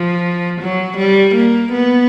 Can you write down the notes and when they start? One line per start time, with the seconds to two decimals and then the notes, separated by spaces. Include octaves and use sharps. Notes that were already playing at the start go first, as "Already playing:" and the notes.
Already playing: F3
0.61 F#3
0.97 G3
1.35 A#3
1.73 B3